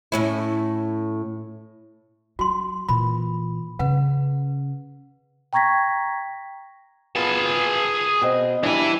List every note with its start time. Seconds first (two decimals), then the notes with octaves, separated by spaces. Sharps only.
0.12 A2 C#4 E4
2.39 F#3 F#4 C6
2.89 A#2 E3 B5
3.79 C#3 C#4 B4 F#5
5.53 G5 A#5 C#6 G#6 A#6 B6
7.16 B3 F4 G#4 A5
8.21 B2 C4 D#5
8.63 E3 G3 D4 G#5